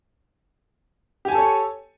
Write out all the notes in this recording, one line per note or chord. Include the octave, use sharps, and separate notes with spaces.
G4 A4 C#5 G#5 A5